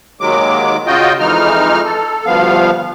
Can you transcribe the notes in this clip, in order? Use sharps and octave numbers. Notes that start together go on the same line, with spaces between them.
D#2 D#3 F#3 G#3 D6
C#3 F4 F#4 D#5 G5
F2 E3 G#3 D#4 F6
A4
D2 G2 F3 B3 F5